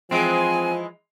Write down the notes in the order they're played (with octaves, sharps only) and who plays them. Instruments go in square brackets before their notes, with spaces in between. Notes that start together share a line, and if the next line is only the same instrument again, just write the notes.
[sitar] E3 G#3 [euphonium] F3 [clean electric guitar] C4 [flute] G#5